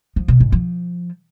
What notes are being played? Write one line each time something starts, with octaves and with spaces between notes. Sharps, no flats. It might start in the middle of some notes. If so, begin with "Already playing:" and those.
F3
B2
G#2
F3